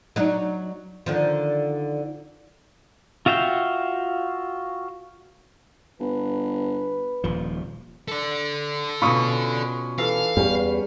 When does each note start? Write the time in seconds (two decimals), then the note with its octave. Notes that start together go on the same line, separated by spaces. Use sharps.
0.16 F#3 D4 D#4
1.06 D3 D#3 F3
3.26 F4 F#4 E5 F5 G5
6.00 G1 B4
7.24 D#1 F3
8.08 A4 D5
9.02 B2 C#4 F4 B5 C#6 D#6
9.98 E3 A4 F5
10.37 E2 G3 C#4